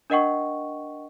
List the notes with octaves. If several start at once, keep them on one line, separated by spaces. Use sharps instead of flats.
D4 A#4 D#5 F#5 G5 C#6